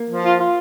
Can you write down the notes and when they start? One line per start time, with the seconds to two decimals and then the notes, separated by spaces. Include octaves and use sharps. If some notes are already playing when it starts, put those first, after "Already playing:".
Already playing: A#3
0.09 F3
0.24 F4
0.39 F4